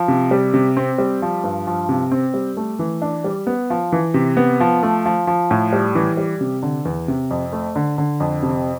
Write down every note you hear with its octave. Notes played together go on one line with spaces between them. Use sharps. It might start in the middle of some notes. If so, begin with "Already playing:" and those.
Already playing: F3
C3
G3
C3
C4
G3
F3
G2
F3
C3
C4
G3
A3
E3
D4
G3
B3
F3
E3
C3
B3
F3
A3
F3
F3
A2
G3
E3
G3
C3
D3
E2
C3
F2
A3
D3
D3
F2
C3